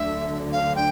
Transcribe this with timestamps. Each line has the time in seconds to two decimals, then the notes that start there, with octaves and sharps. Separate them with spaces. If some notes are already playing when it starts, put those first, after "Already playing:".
Already playing: D2 D3 F#3 E5
0.52 F5
0.75 G5